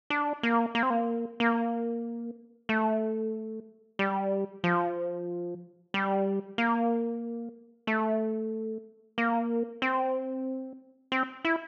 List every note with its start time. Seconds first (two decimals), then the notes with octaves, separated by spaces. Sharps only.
0.10 D4
0.43 A#3
0.75 A#3
0.83 C4
0.90 A#3
1.40 A#3
2.69 A3
3.99 G3
4.64 F3
5.94 G3
6.58 A#3
7.87 A3
9.18 A#3
9.82 C4
11.12 C4
11.45 E4